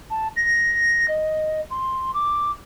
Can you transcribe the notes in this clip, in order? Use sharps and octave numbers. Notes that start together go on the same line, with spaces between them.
A5
A#6
D#5
C6
D6